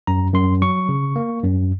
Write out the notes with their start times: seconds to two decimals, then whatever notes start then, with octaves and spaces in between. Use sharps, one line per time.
0.07 F#2 A#5
0.34 F#2 C6
0.62 F#3 C#6
0.89 C#3
1.16 A#3
1.43 F#2